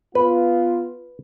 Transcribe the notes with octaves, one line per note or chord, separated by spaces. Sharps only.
B3 F4 B4